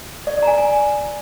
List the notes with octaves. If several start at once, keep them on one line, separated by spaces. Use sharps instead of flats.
D5
D5
A#5
G#5
G#5